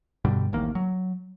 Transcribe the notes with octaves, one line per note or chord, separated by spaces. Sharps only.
G2 B2 D3 G3
D1 A1 D#3 A#3
F#3